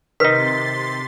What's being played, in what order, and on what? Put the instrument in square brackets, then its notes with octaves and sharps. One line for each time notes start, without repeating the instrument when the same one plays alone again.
[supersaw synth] C3 C6 A6 [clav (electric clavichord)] D#3 D#4 [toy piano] A#4 B4 [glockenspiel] B6